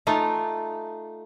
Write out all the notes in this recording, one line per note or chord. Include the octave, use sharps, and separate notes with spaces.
A3 D#4 F4